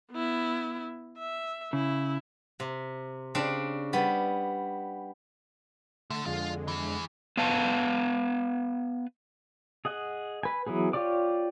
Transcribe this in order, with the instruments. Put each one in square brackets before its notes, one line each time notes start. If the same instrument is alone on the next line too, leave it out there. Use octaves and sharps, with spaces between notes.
[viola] B3 E4
E5
[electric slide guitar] C#3 [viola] E4
[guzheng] C3
C#3 C4 D4
G3 B3
[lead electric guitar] D3 [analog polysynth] A3 A6
[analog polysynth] F2 D3 G#3 [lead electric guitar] F4
[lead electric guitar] E3 G#4
[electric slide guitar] B3 B4 F5 A5
[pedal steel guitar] G#4 D#5 F#5
B4 G#5
E3 F#3 B3 G#4
F4 G4 C#5 D5 D6